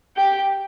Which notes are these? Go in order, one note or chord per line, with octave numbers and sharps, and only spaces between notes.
G4 G5